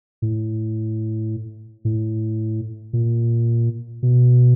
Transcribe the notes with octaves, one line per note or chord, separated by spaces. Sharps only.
A2
A2
A#2
B2